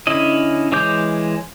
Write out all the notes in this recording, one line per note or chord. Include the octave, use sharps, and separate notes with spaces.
D3 C#4 E4 D#5
E3 G#3 C#5 D6 G6